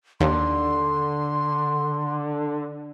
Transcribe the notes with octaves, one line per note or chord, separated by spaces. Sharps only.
D#2 D3 C6